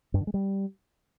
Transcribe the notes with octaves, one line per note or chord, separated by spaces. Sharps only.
G2
D3
G#3
G3